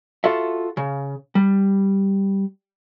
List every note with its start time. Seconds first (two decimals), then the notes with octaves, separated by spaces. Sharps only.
0.24 F4 F#4 A4 E5
0.77 C#3
1.35 G3